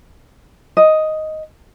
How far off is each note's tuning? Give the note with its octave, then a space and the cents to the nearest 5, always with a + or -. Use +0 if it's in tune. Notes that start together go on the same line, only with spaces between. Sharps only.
D#5 +5